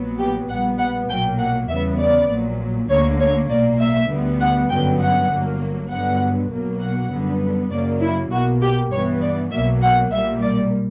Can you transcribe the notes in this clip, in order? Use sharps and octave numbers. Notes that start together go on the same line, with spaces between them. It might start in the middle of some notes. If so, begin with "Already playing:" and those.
Already playing: A#1 A#2 F#3 B3
G4
A#1 A#2 G3 B3 F#5
F#5
B1 A#2 F#3 A#3 G5
F#5
E2 C#3 G3 B3 E5
D5
A#1 A#2 F#3
D2 D3 A#3 C#5
C#5
B1 A#2 A#3 D5
E5
D2 D3 G3 B3
F#5
G1 F#2 D3 F#3 B3 G5
F#5
G1 G2 F#3 A#3
G2 D3 F#3 B3 F#5
B1 B2 F#3 A#3
F#5
F#2 D3 G3 B3
F#2 C#3 F#3 A#3 D5
E4
B1 B2 A#3 F#4
G4
G2 E3 B3 C#5
D5
B1 B2 F#3 A#3 E5
F#5
B1 A#2 G3 A#3 E5
D5